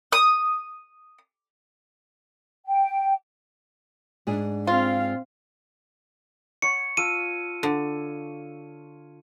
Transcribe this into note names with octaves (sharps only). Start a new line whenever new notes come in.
D#6
G5
G#2 D4 G#4
C4 F4 F5
C#5 F#5 C#6 C#7
F4 A5 E6 D#7
D3